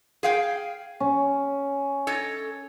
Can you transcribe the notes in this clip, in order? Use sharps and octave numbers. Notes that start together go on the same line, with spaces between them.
G#4 F5 G5
C#4
A4 C#5 D#5